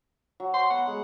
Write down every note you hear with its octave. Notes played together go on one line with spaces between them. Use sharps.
F#3
C6
B3 F#5
G#3